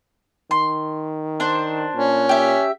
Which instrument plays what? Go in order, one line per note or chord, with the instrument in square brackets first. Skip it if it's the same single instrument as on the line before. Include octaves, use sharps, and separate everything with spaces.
[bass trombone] D#3 [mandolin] C6
[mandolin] D4 C5
[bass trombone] A#2 [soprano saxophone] C#4
[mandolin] G4 E5